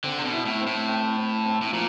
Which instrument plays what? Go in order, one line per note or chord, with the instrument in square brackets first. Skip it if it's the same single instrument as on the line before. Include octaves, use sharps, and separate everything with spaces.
[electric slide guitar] D3 [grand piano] C4
[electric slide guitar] C3
B2
[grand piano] E4
[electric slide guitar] A2
[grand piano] C4
[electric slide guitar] A2
[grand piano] C4
C4
C4
[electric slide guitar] A2
[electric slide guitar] A#2 [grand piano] F3